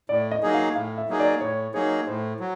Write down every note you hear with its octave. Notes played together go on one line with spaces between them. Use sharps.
A2 D5
D#5
F#3 A#3 D#4 G#4
F5
A2 F5
E5
F#3 A#3 D#4 G#4
D5
A2 C#5
F#3 A#3 D#4 G#4 C#5
A2 C5
F#3